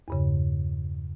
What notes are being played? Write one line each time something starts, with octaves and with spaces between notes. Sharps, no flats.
E2 G2 C#3